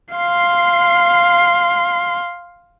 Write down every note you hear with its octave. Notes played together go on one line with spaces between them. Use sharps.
F5 C6